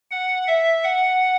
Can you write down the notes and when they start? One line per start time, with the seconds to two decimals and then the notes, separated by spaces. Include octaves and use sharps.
0.11 F#5
0.47 E5
0.84 F#5